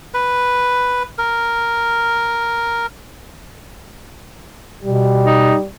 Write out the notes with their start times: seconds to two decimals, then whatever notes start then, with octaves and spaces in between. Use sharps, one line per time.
0.14 B4
1.18 A#4
4.84 B2 G3
5.26 D#4